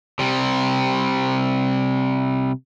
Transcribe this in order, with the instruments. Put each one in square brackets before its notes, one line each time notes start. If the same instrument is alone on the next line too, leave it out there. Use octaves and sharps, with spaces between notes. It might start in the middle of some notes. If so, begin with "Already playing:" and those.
[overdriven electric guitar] C3 G3